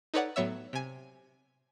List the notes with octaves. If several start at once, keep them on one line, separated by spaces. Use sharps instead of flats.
D#4 A4 B4 C#5 D5 F#5
A2 F#3 B3 C#5 E5 E6
C3 G#5